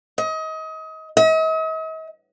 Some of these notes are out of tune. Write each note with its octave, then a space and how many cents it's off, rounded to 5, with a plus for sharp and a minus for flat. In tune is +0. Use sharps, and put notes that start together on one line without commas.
D#5 +30
D#5 +45